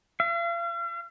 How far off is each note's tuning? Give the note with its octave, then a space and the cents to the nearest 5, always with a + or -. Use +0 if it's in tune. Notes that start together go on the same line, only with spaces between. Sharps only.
F5 -45